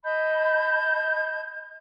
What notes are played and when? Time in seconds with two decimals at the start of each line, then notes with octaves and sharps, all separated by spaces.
0.04 D#5 A5 B5 G6